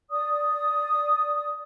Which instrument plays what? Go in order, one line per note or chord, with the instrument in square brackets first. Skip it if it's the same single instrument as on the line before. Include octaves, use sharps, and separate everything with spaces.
[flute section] D5 D#6